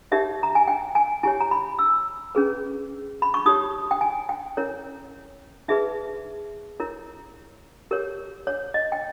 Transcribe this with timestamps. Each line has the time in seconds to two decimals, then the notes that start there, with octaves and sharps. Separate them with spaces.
0.12 D#4 G4 A#4 C#5 E5
0.43 A#5
0.55 G#5
0.68 G5
0.95 G#5
1.23 E4 G4 C#5 G#5
1.40 A#5
1.51 B5
1.79 E6
2.35 C#4 G#4 B4
3.22 B5
3.34 C#6
3.46 D#4 G4 C#5 D#6
3.91 G5
4.01 G#5
4.29 G5
4.57 C#4 E4 A#4 C#5
5.68 D#4 G#4 B4 E5
6.80 E4 A#4 C#5
7.91 G4 A#4 C#5
8.47 C#5
8.74 D#5
8.92 G5